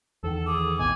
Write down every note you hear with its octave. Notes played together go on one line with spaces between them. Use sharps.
E2 D#3 A4
G#4 D6
A1 D#2 B2 G#5